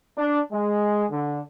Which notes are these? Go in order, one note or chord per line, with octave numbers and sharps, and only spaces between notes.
D4
G#3
D3